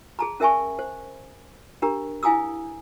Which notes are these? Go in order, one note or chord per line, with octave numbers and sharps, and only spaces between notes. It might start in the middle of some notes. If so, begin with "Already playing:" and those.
G#4 A5 A#5
C#4 A#4 E5 G#5 A5 C#6
C5
D4 G4 A#4 A#5
E4 F5 G#5 A#5 D#6 E6